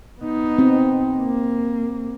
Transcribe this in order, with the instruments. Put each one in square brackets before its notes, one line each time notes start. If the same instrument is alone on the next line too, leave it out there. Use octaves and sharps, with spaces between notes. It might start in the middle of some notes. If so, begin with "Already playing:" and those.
[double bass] B3 D#4
[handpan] C4
[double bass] A#3